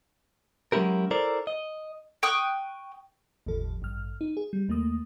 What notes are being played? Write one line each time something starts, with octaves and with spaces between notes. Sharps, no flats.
F#3 G#3 C#4 E4 G4 A#4
E4 A4 A#4 C5 D5
D#5
G5 C#6 D#6 F#6
G1 D#2 A2 F3 A4
A1 G2 F6
D#4
G#4
G3
D#2 A3 A#3 D#6